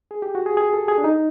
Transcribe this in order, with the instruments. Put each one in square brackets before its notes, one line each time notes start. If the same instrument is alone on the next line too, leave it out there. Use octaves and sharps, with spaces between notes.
[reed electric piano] G#4
G4
F#4
G#4
G#4
A4
G#4
D4
D#4